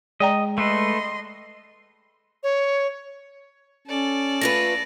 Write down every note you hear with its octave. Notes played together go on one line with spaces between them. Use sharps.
G#3 D5 D#5 G5 A#5
A3 A4 B4 D#5 C6
C#5
C#4 A4 D5
A3 F4 B4 A#6